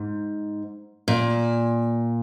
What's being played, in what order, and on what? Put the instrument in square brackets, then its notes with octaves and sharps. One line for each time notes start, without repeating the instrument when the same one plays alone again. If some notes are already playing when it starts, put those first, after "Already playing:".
Already playing: [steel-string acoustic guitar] G#2
A#2